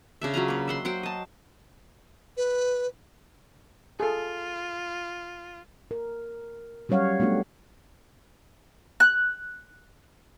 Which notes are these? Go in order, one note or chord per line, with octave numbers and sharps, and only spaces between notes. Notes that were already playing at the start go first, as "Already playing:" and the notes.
C#3 D4 E5
F#3 F4 B4 A#5
A#3 B4
E5 F#5 C6
F#3 C5 F#5 G5
D#5 A5
B4
F4 G#4 A4
A#4
F#3 G3 C#4 C#5 F5 F#5
A3 B3 D4 F#4 G4
F#6